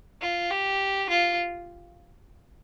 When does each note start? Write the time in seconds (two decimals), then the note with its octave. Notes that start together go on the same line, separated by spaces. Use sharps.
0.21 F4
0.51 G4
1.10 F4